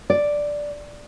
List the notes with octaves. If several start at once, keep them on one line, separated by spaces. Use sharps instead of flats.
D5